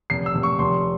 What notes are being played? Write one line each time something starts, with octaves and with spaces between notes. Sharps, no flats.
F1 C7
E6
F1
C#6
F1 C6